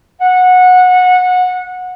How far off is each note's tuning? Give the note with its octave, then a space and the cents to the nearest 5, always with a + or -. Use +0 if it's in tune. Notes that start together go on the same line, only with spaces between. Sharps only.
F#5 -20